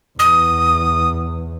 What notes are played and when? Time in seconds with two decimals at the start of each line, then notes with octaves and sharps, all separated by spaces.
0.19 E2 D#6